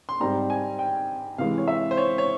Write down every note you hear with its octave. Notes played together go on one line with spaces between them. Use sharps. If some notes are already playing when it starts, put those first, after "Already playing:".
C6
G#2 G3 C4 A#5
G#5
G5
C3 E3 G#3 F5
C#5
E5
C5
C#5
C#5